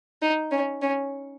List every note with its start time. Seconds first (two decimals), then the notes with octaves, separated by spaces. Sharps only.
0.22 D#4
0.51 C#4
0.82 C#4